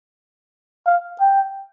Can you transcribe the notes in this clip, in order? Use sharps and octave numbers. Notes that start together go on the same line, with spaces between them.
F5
G5